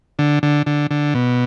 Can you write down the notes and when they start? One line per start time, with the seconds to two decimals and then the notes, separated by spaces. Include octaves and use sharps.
0.19 D3
0.43 D3
0.66 D3
0.91 D3
1.15 B2